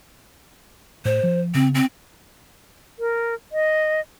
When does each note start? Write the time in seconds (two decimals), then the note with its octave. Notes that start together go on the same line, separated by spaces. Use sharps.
1.05 A2 C5
1.23 F3
1.54 C#3 C4
1.75 C4
2.99 A#4
3.52 D#5